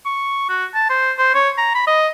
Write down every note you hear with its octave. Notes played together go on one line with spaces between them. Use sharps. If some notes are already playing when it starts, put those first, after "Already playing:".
C#6
F#4
A5
C5
C5
C#5
A#5
B5
D#5